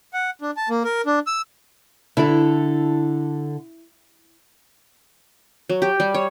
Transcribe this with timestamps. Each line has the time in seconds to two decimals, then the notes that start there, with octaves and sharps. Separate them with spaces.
0.13 F#5
0.41 D4
0.57 A5
0.69 A#3
0.84 A#4
1.06 D4
1.27 E6
2.17 D3 E4 A4
5.69 F#3
5.82 G4
6.00 G3
6.14 C#5